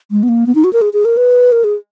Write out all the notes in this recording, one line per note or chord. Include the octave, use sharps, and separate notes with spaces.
G#3
B3
A#3
B3
D#4
F#4
A#4
G#4
G#4
A#4
B4
A#4
G#4